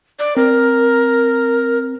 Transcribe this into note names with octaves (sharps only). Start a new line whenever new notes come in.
D5
C4 A#4